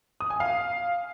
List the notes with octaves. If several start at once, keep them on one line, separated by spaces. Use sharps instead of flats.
D#6
G#5
F5